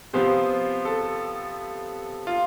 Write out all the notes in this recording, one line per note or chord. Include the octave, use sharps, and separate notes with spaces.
C3 F3 B3 C5
A4
F4